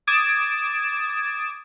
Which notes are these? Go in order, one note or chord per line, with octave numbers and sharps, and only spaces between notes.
D6 D#6 G#6 A6 D7 E7